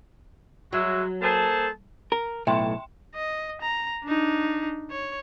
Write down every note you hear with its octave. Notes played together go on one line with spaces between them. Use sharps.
F#3 G#3 F#4 E5
A#3 G#4 A4 C5 A5
A#4
B1 A2 E5 G5 C6
D#5
A#5
D4 D#4
C#5